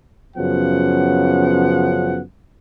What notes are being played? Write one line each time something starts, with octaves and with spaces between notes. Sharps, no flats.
F#2 C#3 F3 B3 F#5